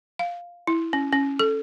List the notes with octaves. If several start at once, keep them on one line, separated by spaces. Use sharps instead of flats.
F5
E4
C#4
C#4
A4